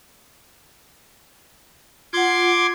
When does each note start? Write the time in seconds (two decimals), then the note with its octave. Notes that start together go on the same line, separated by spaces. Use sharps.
2.13 F4 F#5 C6 D6 G#6